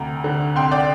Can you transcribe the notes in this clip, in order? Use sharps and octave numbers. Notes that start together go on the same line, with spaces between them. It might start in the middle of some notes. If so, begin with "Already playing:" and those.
Already playing: D2 C3 A#5
D3
C2 G5 C6
D5 G5